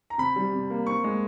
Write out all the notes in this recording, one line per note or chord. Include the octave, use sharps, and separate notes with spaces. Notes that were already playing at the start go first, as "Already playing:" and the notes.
A#5
C3 B5
G3
C3
A#3
C4 C#6
G#3